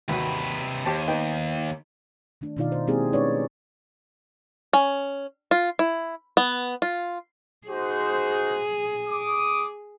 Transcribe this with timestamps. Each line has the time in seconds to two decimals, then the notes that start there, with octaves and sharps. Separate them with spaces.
0.09 D#2 C3 F#4 B4
0.85 D#2 G4 C5 A5
1.08 B3 D#4 G5
2.41 D#3 A3 D4
2.57 B2 D#3 D#4 F4 D5 F5
2.72 C5
2.87 G#3 A#3 C4 E4 G4 G#4
3.13 A3 C#4 D#4 B4 C#5 D5
4.73 C#4
5.51 F4
5.79 E4
6.37 B3
6.82 F4
7.68 D#4 F#4 G#4 C5
9.08 D6 D#6